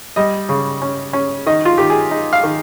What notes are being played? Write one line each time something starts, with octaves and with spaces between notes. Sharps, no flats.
G3 D#5
C#3
C#4
C#4
D#3 D#5
F4
D#3 G4
G#4
D#4
F5
D#3